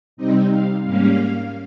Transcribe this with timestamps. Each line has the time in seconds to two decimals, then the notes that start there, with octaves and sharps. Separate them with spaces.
0.17 C3 G3 C4 D#4 D#5
0.51 F5
0.85 G#2 G3 A#3 C#4 F5